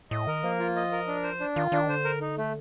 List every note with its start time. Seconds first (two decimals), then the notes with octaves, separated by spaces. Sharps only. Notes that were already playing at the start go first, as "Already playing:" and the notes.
0.11 A2 D#5
0.27 D#3 A#4
0.43 F3 A#3
0.60 F4
0.76 D#5
0.92 A#4
1.07 D4
1.23 C5
1.40 D4
1.56 D#3 F4
1.72 D#3 D4
1.89 D3 C5
2.04 A#4
2.21 D#4
2.38 A3